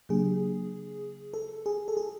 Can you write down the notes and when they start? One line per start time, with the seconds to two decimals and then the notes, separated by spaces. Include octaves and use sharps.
0.09 C#3 F#3 A#3 D4 G4 G#4
1.34 A4
1.66 G#4
1.88 A4
1.97 G#4